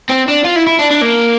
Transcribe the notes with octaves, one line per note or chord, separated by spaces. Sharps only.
C4
D4
F4
E4
E4
D4
D4
A#3